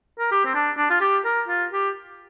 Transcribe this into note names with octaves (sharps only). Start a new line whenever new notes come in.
A#4
G4
C4
D4
D4
F4
G4
A#4
F4
G4